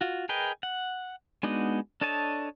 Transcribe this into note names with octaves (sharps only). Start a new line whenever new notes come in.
F4 F#4
G#4 A#4 B4 D#5 G5
F#5
G#3 B3 D4 D#4 F#4
D4 A4 C#5 D#5 A5